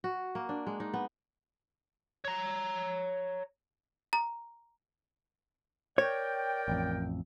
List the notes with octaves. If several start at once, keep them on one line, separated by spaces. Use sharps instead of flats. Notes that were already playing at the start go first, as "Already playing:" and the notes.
F#4
A#3
D4
G#3
D#4
B3
C#5 A#5
A#5
A#4 C#5 D5 G5
A1 F2